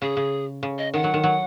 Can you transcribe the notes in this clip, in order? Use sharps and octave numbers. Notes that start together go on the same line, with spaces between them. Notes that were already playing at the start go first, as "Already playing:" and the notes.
C#3 G#4
C#3
C#3
D#5
D#3 F#5
F#3
D#3
F#3